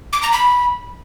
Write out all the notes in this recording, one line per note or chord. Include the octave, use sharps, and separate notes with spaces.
D6
A#5
B5